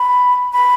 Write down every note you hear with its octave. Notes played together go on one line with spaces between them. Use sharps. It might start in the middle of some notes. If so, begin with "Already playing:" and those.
Already playing: B5
B5